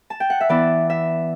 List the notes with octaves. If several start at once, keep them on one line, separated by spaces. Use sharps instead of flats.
A5
G5
F#5
E5
E3 B3 E4 D5
E5